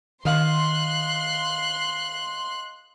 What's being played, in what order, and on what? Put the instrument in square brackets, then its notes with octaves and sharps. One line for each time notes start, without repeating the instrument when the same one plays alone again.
[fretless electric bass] D#3 [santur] D#5 F5 [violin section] C6 [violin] F#6